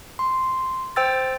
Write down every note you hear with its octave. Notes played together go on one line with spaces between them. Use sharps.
C6
C5 G5 E6 A6